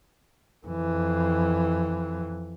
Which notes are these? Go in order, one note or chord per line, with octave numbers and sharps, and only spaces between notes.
F2 E3